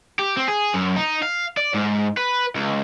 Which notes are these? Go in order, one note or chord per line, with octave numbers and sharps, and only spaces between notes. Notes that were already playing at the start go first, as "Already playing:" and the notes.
G4
C4
G#4
F#2
D#4
F5
D5
G#2
B4
C#2